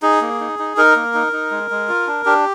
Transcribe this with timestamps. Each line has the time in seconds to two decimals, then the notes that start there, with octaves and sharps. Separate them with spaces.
0.02 D#4 G#4
0.21 A#3
0.40 D#4
0.59 D#4
0.77 D#4 A#4
0.96 A#3
1.14 D#4
1.32 D#4
1.51 G#3
1.70 G#3
1.89 F4
2.07 D4
2.26 D4 G4